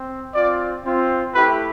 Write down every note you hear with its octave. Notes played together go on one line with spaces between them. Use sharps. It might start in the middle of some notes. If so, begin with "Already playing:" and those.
Already playing: C4
C4 F4 D5
C4 F4
A3 E4 G4 B4